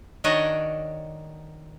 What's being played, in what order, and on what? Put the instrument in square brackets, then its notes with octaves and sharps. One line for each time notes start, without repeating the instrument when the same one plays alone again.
[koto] D#3 D4 F#4 C#5 D#5